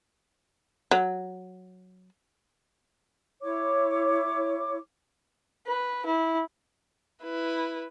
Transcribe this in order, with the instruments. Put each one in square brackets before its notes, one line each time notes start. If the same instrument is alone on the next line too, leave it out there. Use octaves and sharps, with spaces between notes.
[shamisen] F#3
[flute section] E4 C#5 D6
[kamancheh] B4
E4
E4 B4